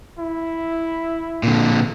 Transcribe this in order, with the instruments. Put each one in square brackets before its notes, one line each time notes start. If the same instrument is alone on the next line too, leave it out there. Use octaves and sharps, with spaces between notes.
[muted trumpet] E4
[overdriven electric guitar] A#2 D3